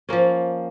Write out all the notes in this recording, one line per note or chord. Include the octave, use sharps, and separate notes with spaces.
F3 A#3 C#4